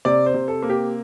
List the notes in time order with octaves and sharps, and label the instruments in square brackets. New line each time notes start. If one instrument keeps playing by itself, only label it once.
[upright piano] C3 D5
C5
C3
A4
A#3
G4